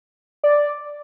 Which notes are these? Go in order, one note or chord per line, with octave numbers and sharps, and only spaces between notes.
D5